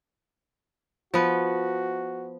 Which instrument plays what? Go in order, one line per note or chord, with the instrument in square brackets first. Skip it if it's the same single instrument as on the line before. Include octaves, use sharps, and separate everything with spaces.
[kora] F3 B3 [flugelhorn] F#4